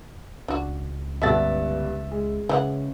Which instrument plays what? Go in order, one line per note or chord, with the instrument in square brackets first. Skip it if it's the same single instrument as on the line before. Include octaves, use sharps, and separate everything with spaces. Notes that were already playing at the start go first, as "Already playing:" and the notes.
[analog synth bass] C#2 [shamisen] D4 F#4
[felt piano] G1 C2 G2 [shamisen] A3 A4 F#5 [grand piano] E5 A6
[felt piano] G#3
[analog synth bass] C#3 [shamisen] E3 D#4 F#5